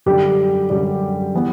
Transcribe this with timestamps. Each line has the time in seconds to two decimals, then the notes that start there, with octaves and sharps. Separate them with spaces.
0.06 F#2 D3 G3 G4
0.70 F#2 D3 G3
1.35 E3 B3